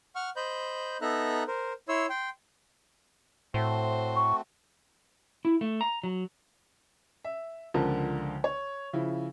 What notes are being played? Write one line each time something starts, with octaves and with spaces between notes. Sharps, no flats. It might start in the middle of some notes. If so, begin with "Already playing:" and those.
F#5 C#6 F6
C5 D#5 B5 G6
B3 D#4 A4 E5 A#5 F#6
A#4 C5
E4 C#5 C6 E6
G5 C6
A2 A3 C4 F#4 C5
C#6
E4
A3
A#5
F#3
E5
C#2 D3 F3 A#4 A5
C#5
C#3 F3 E4